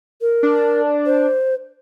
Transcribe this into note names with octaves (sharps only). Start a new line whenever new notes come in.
A#4
D4
C5